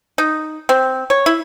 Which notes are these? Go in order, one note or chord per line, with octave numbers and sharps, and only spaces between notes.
D#4
C4
C#5
E4